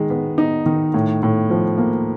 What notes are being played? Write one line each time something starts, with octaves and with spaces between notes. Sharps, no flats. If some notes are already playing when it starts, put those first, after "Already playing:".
Already playing: D#3 G#3
B3
D#4
D#3
A2
A2
F3
A#3